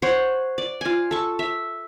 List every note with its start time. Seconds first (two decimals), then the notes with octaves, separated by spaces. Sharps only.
0.02 C5 C#5 F#5
0.58 D5
0.81 F4 G#5
1.11 A4 C#6
1.39 E5